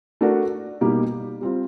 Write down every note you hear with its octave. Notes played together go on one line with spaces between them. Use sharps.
A3 D4 F#4 A#4
B2 G3 A#3 D#4 G4
G3 C4 F4